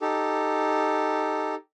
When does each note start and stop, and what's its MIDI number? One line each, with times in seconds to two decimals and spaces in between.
0.01 1.55 63
0.01 1.55 67
0.01 1.55 69